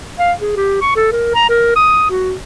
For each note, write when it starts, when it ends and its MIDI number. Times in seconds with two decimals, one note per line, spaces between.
0.19 0.33 77
0.41 0.54 68
0.56 0.81 67
0.82 0.93 85
0.96 1.08 69
1.12 1.32 70
1.34 1.48 82
1.49 1.74 70
1.76 2.06 87
2.10 2.34 66